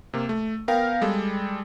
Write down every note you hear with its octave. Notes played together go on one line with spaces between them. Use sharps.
C3 A#3
A3
B3 A#4 F5 G5
G3 G#3 A4